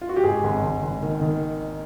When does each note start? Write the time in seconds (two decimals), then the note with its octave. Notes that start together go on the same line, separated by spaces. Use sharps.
0.01 F4
0.09 F#4
0.16 G4
0.24 G#2 G#4
0.44 G#1
0.63 G#1
0.83 G#1
1.03 D#3
1.22 D#3